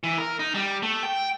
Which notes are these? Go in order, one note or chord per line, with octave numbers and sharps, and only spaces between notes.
E3
A#4
D#4
G3
A3
G5